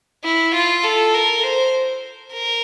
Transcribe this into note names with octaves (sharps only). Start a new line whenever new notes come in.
E4
F4
A4
A#4
C5
A#4